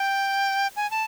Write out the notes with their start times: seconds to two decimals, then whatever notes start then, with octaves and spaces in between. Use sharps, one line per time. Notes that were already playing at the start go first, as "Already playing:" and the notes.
Already playing: G5
0.76 G#5
0.91 A5